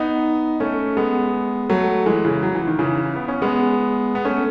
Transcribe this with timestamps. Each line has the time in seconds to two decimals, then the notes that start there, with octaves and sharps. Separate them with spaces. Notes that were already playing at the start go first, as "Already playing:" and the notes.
Already playing: B3 D#4
0.60 A3 C#4
0.97 G#3 B3
1.69 F#3 A3
2.06 E3 G#3
2.25 C#3 E3
2.43 F#3
2.55 E3
2.67 D#3
2.79 C#3 E3
3.16 B3
3.28 C#4
3.42 G#3 B3
4.15 B3
4.25 A3 C#4